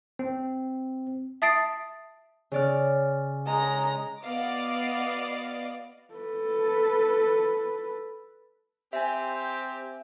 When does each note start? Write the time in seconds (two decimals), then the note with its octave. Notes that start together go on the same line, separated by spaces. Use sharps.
0.19 C4
1.42 E5 A5 D#6 A6 C7 D7
2.52 C#3 D5 F6
3.46 G#3 A#5
4.23 B3 F#4 D5 D#5 F5 D6
6.14 A4 B4
8.93 C4 G4 E5 G#5